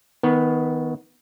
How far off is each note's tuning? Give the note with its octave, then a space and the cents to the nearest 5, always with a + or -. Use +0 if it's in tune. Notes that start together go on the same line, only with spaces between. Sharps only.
D#3 +25 B3 +0